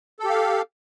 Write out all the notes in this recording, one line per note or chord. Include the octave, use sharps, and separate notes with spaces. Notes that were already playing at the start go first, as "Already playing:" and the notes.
G4 A4 F5